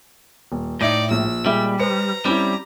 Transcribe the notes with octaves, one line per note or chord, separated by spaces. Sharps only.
D#1
A2 D#4 D5 E5 A#6
A#1 E6
A#2 G3 G#3 E5
B4 C5 A#5 C#7
G3 C4 C#4 E4